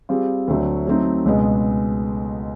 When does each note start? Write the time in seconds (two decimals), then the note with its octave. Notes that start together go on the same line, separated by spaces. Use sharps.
0.09 G3 C4 F4 G#4
0.48 D2 D3 F#3 A3 D4
0.87 F#3 A3 C4 D#4
1.26 C#2 B2 G#3 B3